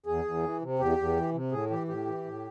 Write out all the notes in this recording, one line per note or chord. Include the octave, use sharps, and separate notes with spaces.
E2 G#4
E2
E3
C3
E2 G4
E2
E3
C3
A2 G#4
E3 G4
A2 G4
E3
A2